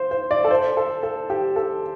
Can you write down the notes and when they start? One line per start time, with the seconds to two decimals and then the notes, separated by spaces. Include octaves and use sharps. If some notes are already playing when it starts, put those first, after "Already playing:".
Already playing: C5
0.11 C5
0.31 D5
0.44 A4
0.50 C5
0.77 A4
1.03 A4
1.30 G4
1.56 A4